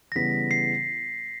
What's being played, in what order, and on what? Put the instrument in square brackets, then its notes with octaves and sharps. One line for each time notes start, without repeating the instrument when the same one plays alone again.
[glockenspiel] A#6
[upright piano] C#3 E3 G3 B3 [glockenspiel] B6
[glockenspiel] C7